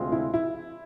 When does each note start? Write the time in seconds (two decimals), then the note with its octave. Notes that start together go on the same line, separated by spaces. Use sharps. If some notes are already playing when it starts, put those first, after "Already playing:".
Already playing: D2 C3 G#3 C4 F4
0.12 E4
0.34 E4